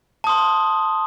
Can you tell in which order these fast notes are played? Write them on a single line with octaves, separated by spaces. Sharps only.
A5 D#6 C6